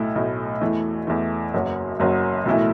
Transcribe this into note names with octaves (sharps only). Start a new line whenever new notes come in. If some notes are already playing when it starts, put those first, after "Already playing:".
Already playing: B1 A2 A3 E4
B1 A2 A3 E4
E2 E3 A3
E2 E3 A3
F#1 F#2 F#3
F#1 F#2 F#3
B1 A2 E3 A3 E4